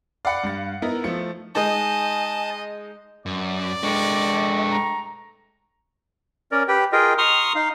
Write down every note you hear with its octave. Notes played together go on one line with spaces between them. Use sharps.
D5 F5 F#5 B5 C#7
G2 A6
B3 D#4 E4 A#4
F3 A3 C#7
G#3 D#4 D#5 G#5 A5
F#2 D5
G#3 D4 A4 D#5 G5 C#6
A#5
C#4 A#4 D5
G4 B4 G5
F4 G#4 A#4 D#5 G5
A#5 C6 C#6 D#6 F6
D#4 F5